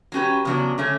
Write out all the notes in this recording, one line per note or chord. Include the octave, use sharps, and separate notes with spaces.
F#3 C#4 G4 B4
E2 C#3 F#3 B3 D4
D3 A3 C#4